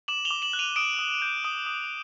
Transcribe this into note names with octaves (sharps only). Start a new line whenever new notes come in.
D6 E7 F#7
F7 G7
D6
E7 F#7
F#6
D#7 F7
D#6 D7 E7
D#6
G6
D#6
D#6